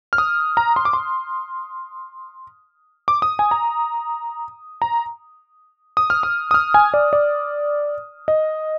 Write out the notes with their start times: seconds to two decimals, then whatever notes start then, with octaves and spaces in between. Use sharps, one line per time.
0.13 F6
0.18 D#6
0.57 A#5
0.76 C6
0.85 D6
0.93 C6
3.08 D6
3.22 D#6
3.39 G#5
3.51 A#5
4.82 A#5
5.97 D#6
6.10 F6
6.23 D#6
6.51 D#6
6.54 F6
6.74 G#5
6.94 D5
7.13 D5
8.28 D#5